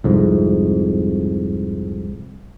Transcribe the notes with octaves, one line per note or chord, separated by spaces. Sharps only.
C2 F2 G#2